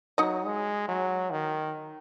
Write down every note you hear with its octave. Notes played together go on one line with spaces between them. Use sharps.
F#3 D#4 D#5
G#3
F#3
D#3